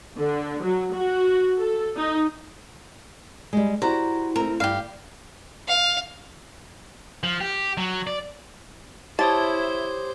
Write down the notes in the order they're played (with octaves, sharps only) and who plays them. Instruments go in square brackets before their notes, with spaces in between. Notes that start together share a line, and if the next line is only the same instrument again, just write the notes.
[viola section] D3
F#3
F#4
A4
D#4
[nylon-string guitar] G3 G#3
[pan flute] E4 [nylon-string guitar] F#4 G4 C5 [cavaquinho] A#5
[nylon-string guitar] A3 C4 [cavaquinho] A#4
[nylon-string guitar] G2 [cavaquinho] G4 F5
[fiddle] F5
[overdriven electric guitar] F3
G4
F#3
D5
[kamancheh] E4 [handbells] G4 C#5 D#6 [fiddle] C5 [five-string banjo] A5